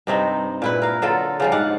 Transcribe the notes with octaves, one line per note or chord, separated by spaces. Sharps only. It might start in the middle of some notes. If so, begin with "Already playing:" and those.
G2 C3 C4 D#4
A#2 E4 B4
A#4 F5
D3 F#3 F4 A4
C#3 F3 G3
G#2 D5 F5 F#5